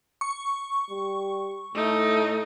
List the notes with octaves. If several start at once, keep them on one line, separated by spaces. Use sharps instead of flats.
C#6
G3
A2 A3 D#4